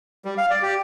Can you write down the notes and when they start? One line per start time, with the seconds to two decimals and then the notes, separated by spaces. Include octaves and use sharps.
0.25 G3
0.38 F5
0.50 D5
0.62 G4